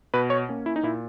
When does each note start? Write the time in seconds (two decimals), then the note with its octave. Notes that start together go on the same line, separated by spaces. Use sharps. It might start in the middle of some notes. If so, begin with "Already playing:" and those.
0.14 B2 B4
0.30 C#5
0.49 A#3 C#4
0.66 E4
0.76 D#4
0.83 A#2 E4